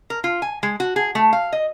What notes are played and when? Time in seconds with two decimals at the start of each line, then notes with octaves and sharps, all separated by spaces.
0.10 A#4
0.24 F4
0.42 G#5
0.63 G#3
0.80 F#4
0.96 G#4
1.15 A3
1.33 F5
1.53 D#5